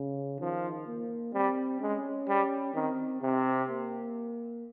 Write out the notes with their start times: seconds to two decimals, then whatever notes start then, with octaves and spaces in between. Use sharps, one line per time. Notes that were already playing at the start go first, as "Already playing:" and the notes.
Already playing: C#3
0.40 D#3 F3
0.87 A#3
1.34 G3 C4
1.81 G#3 C#4
2.28 G3
2.74 D#3 C4
3.22 C3 C4
3.69 A#3